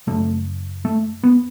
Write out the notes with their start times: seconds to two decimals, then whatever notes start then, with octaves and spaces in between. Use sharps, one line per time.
0.07 F#2 C#3 A3
0.85 A3
1.23 B3